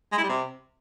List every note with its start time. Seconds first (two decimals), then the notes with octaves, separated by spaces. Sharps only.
0.12 G#3
0.18 E4
0.24 G3
0.29 C3